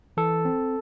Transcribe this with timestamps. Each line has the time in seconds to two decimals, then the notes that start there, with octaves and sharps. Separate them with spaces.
0.17 E3 A4
0.45 C4